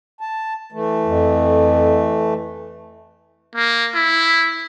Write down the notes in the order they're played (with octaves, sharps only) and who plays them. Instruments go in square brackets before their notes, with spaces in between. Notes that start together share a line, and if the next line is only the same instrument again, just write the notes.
[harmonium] A5
E3 A3
[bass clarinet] F2
[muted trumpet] A#3
E4